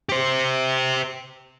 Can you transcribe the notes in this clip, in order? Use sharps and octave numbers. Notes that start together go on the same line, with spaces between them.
G4 C5